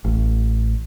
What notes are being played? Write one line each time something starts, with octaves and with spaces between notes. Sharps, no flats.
A1